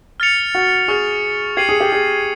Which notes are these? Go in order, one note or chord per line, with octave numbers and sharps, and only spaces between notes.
F6 A6 C#7 F7
F#4
G#4 C#6 F6 A6
G4 G#6 C7 D#7 F#7
G#4
G4
G#4